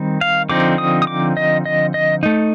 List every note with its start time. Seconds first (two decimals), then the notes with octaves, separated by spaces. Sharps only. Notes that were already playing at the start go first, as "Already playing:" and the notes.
Already playing: D#3 G3 C4 D#4
0.21 F5
0.49 D3 F3 C4 D#4 D6
0.78 D#6
1.02 D#6
1.07 D6
1.37 D#5
1.66 D#5
1.94 D#5
2.23 A3 D#4